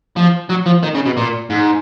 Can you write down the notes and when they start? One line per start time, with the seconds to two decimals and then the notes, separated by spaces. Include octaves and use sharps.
0.16 F3
0.49 F#3
0.66 F3
0.83 D#3
0.94 C#3
1.05 B2
1.17 A#2
1.50 G#2